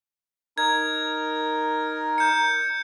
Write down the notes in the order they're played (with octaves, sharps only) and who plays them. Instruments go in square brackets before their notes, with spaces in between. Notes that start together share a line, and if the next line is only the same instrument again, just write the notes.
[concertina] D#4 A#4 [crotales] G#6
[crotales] G6 C#7